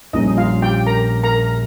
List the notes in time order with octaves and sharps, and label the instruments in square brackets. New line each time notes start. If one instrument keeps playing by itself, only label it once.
[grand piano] A#1 A#2 G3 C#4 [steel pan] D#4 D#5
[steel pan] F4 F5
G4 G5
A#4 A#5
A#4 A#5